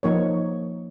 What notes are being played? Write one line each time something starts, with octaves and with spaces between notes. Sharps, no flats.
F3 A#3 D#4 A#4 C#5